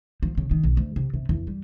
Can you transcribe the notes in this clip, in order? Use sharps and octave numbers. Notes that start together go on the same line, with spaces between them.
F3
C#3
D#3
B1
D2
C3
C3
E2
G3